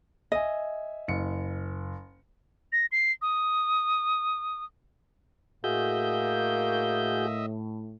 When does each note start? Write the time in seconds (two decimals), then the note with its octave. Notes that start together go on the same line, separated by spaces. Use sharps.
0.32 D#5 E5 G#5
1.08 F#1 C#7
2.72 A#6
2.92 C7
3.22 D#6
5.64 A2 A#3 F#4 G#4 D#5 E5 G6